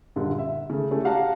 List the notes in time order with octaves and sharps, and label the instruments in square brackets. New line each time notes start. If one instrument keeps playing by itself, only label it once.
[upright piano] F#2 A#2 D3 G3
E5
C#3 A3
A3 C#4 E4 G4 A4
F#4 G4 F5 F#5 A5 A#5